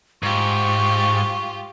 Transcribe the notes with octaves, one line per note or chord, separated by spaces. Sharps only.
G#2 F4 G4 C#6